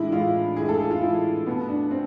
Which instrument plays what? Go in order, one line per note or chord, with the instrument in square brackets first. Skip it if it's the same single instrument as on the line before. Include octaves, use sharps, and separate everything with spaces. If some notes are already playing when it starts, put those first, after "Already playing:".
Already playing: [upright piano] A2 E3 G#3 D4 E4
A2 E3 G#3 F4
A2 E3 G#3 G#4
A4
G#4
F4
A2 E3 G#3 E4
B2 A3 B3
D4
C4